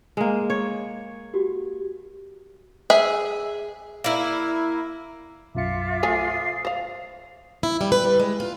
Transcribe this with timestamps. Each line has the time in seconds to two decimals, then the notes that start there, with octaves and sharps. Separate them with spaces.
0.17 G#3 A#3
0.50 C#5
1.34 F#4 G4
2.90 G#4 E5
4.04 A#3 E4
5.55 B1 F#2 F4 E5 D6 C#7
6.03 F3 A3 G#5 D#6 C7
6.65 C5 F5
7.63 E4
7.81 G3
7.92 B4
8.05 G3
8.19 G#3
8.40 F4